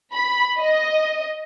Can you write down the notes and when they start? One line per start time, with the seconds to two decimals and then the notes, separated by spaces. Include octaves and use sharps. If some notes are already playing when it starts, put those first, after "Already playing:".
0.13 B5
0.59 D#5